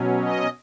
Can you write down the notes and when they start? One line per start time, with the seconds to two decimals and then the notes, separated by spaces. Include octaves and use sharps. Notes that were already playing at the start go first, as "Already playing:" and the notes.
Already playing: B2 F#3 C#4
0.20 D#5